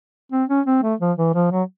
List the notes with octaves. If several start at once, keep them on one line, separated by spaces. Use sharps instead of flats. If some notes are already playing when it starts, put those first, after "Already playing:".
C4
C#4
C4
A3
F3
E3
F3
F#3